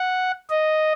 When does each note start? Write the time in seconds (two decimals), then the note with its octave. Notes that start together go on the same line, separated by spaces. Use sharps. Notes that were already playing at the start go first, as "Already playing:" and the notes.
Already playing: F#5
0.50 D#5